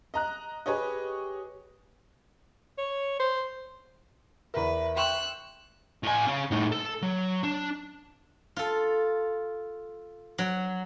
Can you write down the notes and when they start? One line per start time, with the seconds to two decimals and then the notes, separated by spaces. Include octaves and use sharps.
0.14 D#5 A#5 F#6
0.66 G4 G#4 B4 C#5 D#5
2.78 C#5
3.19 C5
4.54 E2 A#4 B4 E5
4.96 G5 C6 C#6 E6 F#6
6.03 A2 G#5
6.27 C#4 G#4
6.51 A2 D#4
6.72 A4
7.03 F#3
7.44 D4
8.56 F4 A4
10.38 F#3